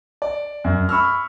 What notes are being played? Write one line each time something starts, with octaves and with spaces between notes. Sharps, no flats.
D5
F#2
B5 C#6 E6 F6